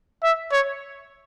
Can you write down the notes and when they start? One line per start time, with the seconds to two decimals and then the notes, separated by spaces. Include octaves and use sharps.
0.23 E5
0.52 C#5